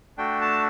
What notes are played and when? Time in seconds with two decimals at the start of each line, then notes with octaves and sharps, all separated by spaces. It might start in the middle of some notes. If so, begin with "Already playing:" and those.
0.18 A3 D4 F#4 G5
0.41 A5